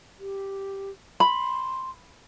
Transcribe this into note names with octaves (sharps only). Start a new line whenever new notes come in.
G4
B5 C6